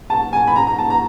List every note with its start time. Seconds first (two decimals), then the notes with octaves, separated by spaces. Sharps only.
0.10 A5
0.33 G#5
0.47 B5
0.56 A#5
0.67 A#5
0.79 A5
0.90 A#5